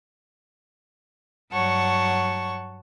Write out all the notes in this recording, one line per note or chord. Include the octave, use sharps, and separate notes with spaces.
G2 F#3 C#5 F#5 A5 C#6